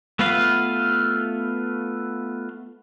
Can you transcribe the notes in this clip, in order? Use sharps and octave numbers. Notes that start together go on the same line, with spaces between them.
A3 B3 F4 B4 F5